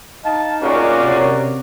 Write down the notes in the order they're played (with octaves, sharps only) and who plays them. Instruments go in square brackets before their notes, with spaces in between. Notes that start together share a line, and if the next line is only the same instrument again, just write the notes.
[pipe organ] D#4 [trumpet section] F5 A5
[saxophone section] A#2 C#3 [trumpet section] F#4 A#4 D5
[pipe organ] C3